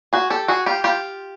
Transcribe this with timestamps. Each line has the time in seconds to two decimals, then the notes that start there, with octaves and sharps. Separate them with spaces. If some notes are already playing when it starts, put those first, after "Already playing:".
0.13 F#4 G#4
0.30 G4 A4
0.48 F#4 G#4
0.66 F4 G4
0.84 F4 G4